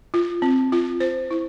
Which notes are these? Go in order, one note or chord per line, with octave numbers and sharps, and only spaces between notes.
F4
C4
F4
C5
E4